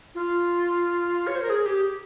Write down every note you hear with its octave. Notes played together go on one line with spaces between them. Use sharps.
F4
C#5
C5
A#4
G#4
G4